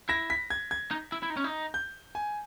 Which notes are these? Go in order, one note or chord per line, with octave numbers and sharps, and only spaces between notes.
E4 A#6
B6
G#6
G#6
D#4
E4
E4
D#4
C#4
D#4
G6
G#5